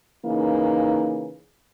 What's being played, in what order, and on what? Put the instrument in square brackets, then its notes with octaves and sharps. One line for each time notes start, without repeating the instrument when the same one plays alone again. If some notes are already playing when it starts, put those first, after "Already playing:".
[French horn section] C#3 E3 A#3 D#4